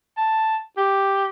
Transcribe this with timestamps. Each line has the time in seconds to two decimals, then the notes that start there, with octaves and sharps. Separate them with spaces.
0.17 A5
0.77 G4